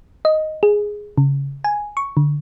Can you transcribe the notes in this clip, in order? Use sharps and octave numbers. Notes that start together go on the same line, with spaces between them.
D#5
G#4
C#3
G#5
C#6
D3